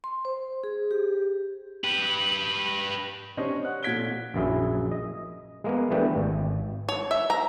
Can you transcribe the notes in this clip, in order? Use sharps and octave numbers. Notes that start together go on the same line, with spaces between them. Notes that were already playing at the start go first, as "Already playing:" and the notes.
C6
C5
G#4
G4
G4 B4
C#4 D4 G4 C5 C#5 D#5
D#5 F#5 F#6
A#2 A4 G#6 B6 D7 G7
A#1 F#2 E4 G#4
D#5
G#3 A#3 B3
E3 A3 B3 D4 G4 G5
G#1
C#5
E5
A#5